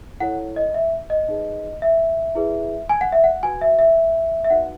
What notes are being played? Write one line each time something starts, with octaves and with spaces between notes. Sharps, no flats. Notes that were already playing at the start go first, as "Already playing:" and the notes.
E4 A4 C#5 F#5
D#5
E5
D#5
D#4 G#4 B4
E5
E4 G#4 B4
G#5
F#5
E5
F#5
F#4 B4 G#5
E5
E5
E5
D#4 F#4 B4 F#5